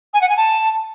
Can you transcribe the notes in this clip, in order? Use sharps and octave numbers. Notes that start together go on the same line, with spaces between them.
G#5
F#5
G#5
A5